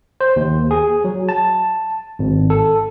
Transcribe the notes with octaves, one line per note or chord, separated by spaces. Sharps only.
C5
D#2
G#4
F#3
A5
G#1
A4